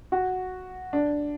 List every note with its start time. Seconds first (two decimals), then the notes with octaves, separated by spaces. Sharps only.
0.12 F#4
0.93 D4